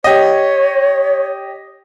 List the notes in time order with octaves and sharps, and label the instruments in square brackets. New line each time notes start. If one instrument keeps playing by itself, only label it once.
[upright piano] G4 D#5 [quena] C#5